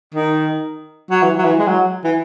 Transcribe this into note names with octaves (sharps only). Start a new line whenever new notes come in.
D#3
F#3
E3
F#3
E3
G#3
F#3
E3